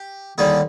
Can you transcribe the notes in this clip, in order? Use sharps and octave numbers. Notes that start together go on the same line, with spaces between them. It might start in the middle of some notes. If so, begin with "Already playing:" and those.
Already playing: G4
D#2 D3 G3 G#4